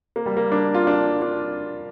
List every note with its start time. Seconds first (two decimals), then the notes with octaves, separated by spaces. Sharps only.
0.16 A#3
0.26 G3
0.37 A#3
0.52 D4
0.74 F4
0.87 D4
1.22 D4